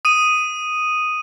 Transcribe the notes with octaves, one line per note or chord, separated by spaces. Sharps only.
D#6 D#7